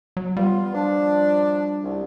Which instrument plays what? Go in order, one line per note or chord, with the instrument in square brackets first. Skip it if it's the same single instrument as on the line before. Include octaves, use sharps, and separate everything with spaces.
[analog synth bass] F#3
[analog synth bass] G3 [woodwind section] B3 F4
[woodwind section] F3 D4
C2